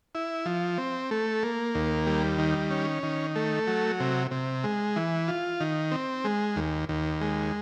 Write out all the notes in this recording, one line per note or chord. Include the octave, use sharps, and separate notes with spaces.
E4
F3
C4
A3
A#3
D#2
G3
D#3
C#4
D#3
A3
F#3
C3
C3
G#3
E3
F4
D#3
C4
G#3
D#2
D#2
G#3